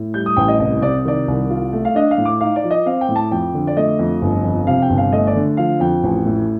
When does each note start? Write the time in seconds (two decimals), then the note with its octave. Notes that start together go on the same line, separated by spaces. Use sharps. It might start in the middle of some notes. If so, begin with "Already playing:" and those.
Already playing: A2
0.14 G3 G6
0.26 D#6
0.37 A1 G5
0.48 D#5
0.59 C2 D#5
0.82 C3 D5
1.05 D#3 D5
1.28 C2
1.50 F4
1.73 A3
1.85 F5
1.95 D4 D#5
2.11 F5
2.18 A2
2.25 D6
2.41 D#4 F5
2.56 D5
2.64 F3
2.71 D#5
2.86 C4 F5
3.01 G5
3.09 A2
3.16 A5
3.31 F2 G5
3.54 D3
3.67 D5
3.77 A3 D#5
3.99 F2
4.22 G1
4.44 F2
4.67 C3 F5
4.82 G5
4.90 G1
4.98 F5
5.12 A3 D#5
5.27 D5
5.36 D3
5.57 F3 F5
5.80 F2 G5
6.03 A1
6.26 A2